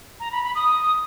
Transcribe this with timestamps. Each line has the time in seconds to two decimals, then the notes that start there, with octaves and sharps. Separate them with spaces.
0.20 A#5
0.32 B5
0.43 B5
0.55 D#6